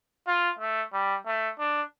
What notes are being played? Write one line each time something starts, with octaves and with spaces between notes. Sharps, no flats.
F4
A3
G3
A3
D4